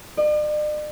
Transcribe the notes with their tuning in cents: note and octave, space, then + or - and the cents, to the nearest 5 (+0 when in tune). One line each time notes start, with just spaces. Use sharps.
D5 +45